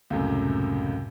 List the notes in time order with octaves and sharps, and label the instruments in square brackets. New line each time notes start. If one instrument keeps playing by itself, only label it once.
[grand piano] C#2 F#2 A2 C3